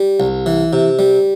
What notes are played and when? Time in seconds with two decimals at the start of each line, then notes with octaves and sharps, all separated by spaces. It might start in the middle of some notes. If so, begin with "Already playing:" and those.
Already playing: G3
0.20 C2
0.46 E3
0.73 C3
0.99 G3